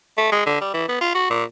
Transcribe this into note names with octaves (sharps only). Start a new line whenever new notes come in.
A3
G#3
D3
G3
E3
B3
F4
F#4
A#2